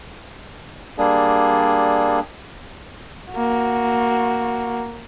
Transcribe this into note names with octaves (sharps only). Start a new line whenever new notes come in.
G3 A#3 D4 G#4
A#3 F#4